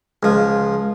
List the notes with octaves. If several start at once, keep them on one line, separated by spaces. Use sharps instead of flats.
C#2 F3